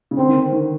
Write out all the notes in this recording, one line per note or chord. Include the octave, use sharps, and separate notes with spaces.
C#3
D3 C4
D#3
D3
D#3